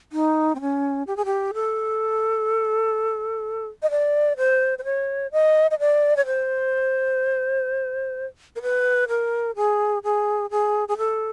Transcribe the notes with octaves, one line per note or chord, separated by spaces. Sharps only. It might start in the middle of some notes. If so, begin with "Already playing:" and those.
D#4
C4
C#4
G4
G#4
G4
A4
D#5
D5
C5
C5
C#5
D#5
D#5
D5
C#5
C5
A#4
B4
A#4
G#4
G#4
G#4
G#4
A4